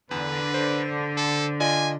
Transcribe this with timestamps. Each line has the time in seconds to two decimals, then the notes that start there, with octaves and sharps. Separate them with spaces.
0.11 E2 D3 B4
0.54 C5
1.17 A4
1.60 F4 D5 D#5 G#5